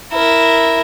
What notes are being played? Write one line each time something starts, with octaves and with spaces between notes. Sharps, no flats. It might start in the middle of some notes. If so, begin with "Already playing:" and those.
E4 A#4